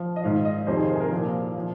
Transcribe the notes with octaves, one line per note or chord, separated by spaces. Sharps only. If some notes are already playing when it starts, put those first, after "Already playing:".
Already playing: F3
D#5
G#2 D#3 F5
D#5
F2 C3 D#3 C5
G#4
A#4
G#4
A#4
A#2 F3
F3